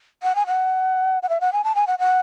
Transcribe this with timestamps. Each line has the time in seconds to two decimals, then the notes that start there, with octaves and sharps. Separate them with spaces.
0.23 F#5
0.35 G#5
0.47 F#5
1.23 F#5
1.29 E5
1.41 F#5
1.53 G#5
1.64 A5
1.75 G#5
1.87 F#5
1.99 F#5